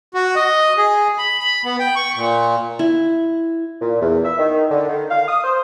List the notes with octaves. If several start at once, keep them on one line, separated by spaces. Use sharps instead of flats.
F#4
D#5
G#4
B5
B5
B3
G5
C#6
A#2
E4
A#2
E2
E5
D#3
D3
D#3
F5
D#6
C5